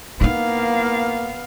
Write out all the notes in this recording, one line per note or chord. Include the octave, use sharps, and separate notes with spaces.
A#3 B3 D#4 E4 F5